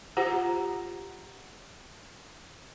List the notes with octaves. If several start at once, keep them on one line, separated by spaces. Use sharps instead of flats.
F4 G4 C5 F#5 A#5